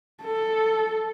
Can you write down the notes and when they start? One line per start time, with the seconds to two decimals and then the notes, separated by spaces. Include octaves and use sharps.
0.23 A4